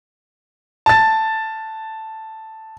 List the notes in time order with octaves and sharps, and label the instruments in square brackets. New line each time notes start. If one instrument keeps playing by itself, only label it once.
[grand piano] A5 A6